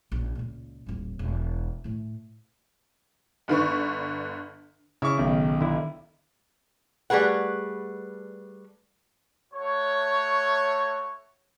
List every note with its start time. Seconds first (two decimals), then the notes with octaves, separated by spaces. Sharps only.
0.12 A#1 C#3
0.35 C#2 A#2
0.86 D#1 A1
1.19 E1
1.84 A2 A3
3.48 G1 D3 B4 C#6
5.02 C#3 E4 C#5 C#6
5.17 B1 D#3
5.61 D3 E4
7.10 G3 A3 G#4 B4 F#5
9.53 A3 F#4 C#5